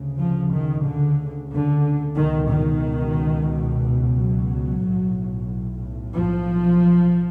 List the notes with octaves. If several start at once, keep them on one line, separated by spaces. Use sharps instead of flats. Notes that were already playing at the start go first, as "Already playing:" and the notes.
Already playing: D2 C#3
F3
D#3
D3
D3
C#2 B2 D#3
D#3
F#3
B1 A2
F3